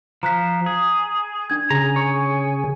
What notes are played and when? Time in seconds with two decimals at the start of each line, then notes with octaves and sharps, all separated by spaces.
0.23 F3 A#5 F#6 B6
0.66 G#4
1.50 D4 G#6
1.70 C#3 G#4 A#5
1.96 C#5